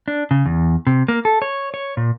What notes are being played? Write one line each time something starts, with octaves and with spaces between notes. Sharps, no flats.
D4
C#3
E2
C3
A#3
A4
C#5
C#5
A#2